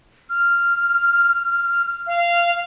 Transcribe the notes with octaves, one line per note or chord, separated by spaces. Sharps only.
F6
F5